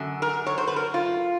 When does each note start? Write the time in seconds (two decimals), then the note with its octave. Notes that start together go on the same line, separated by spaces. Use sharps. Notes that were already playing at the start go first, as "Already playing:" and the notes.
Already playing: F#2 D3
0.22 A#4
0.46 C#5
0.58 C5
0.68 B4
0.76 A#4
0.94 F4